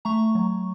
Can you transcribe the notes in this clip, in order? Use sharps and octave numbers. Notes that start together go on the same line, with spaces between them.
A3 A#5 C#6
F#3